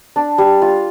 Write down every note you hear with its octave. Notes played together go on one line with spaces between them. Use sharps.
D4
G3
F4